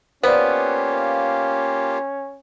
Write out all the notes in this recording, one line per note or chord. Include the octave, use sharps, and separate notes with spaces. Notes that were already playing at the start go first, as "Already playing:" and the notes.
A#3 B3 C#4 F4 G4 C5 D5